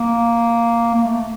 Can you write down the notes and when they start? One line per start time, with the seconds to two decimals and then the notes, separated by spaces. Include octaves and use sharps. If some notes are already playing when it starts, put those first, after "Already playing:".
Already playing: A#3
0.94 A#3
1.04 A3